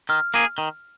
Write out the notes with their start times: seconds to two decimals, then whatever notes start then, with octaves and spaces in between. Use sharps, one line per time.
0.09 D#3 F6
0.34 A#3 G#4
0.58 D#3